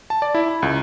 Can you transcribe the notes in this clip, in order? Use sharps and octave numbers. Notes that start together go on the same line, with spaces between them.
A5
D5
E4
B5
C#2